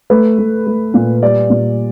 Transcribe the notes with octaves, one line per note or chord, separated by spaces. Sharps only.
A3 B4
A3
A3
A#2
G3 D5
A#2